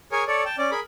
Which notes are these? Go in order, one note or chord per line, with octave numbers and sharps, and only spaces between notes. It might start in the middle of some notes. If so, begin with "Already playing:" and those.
G#4 A#4 C#5 G#5
A4 C#5 D5
G5 A5
C#4 D5
G#4 A#4 B5